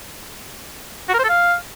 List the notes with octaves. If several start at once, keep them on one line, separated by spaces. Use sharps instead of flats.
F#4
A#4
C5
A4
F5